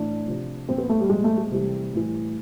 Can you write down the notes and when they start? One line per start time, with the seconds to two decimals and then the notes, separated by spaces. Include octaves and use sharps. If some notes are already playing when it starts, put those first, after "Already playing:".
Already playing: A2 E3 D4
0.27 C3 F3
0.69 A#2 F3 C4
0.78 B3
0.89 A3
1.00 G3
1.09 A#2 F3 G#3
1.24 A3
1.38 G#3
1.52 C3 E3 G3
1.93 A2 E3